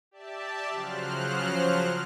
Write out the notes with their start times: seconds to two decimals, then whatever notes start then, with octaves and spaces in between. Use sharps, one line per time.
0.11 G4 D5 E5 A5
0.71 C#3 F3 F#3 C5 F6 F#6